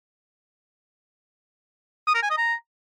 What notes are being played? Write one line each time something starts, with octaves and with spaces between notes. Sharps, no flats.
D#6
A#4
G#5
D#5
A#5